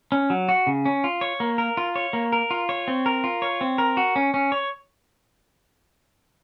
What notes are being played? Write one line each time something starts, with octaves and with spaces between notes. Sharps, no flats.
C#4
F#3
F#4
C#3
C#4
F4
C#5
A#3
A#4
F4
C#5
A#3
A#4
F4
C#5
C4
A#4
F4
C#5
C4
A#4
F#4
C#4
C#4
C#5